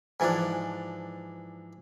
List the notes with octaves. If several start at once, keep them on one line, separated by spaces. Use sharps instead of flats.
G#2 E3 F3 D4